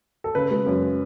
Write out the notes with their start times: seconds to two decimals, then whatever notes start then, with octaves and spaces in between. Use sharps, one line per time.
0.24 A4
0.35 C#3 B4
0.51 G#3
0.67 F#2